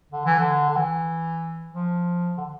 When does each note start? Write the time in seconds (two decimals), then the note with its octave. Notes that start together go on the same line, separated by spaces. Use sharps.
0.12 D3
0.26 E3
0.39 D3
0.70 D3
0.77 E3
1.73 F3
2.38 D3